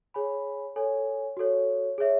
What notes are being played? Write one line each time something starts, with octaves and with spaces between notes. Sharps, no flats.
G#4 C#5 G#5 B5
A4 C#5 G#5
F#4 A4 C#5
G#4 C#5 E5